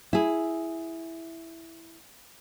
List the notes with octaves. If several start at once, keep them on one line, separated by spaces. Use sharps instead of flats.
E4 G#4